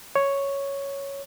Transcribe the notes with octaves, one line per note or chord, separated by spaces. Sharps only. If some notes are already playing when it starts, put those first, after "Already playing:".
C#5